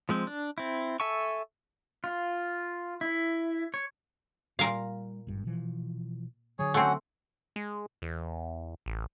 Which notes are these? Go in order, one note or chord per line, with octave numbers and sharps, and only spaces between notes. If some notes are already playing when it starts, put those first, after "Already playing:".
F3 G#3 C4
D4
C4 E4
A4 E5 G#5 A5 C#6
F4
E4
C#5
A#2 G3 A#4 F5
G#1 G2
B2 E3 F3
D3 F#3 G#4 C#5
A3 C4 C#4 F#4 F#5
G#3
E2
A1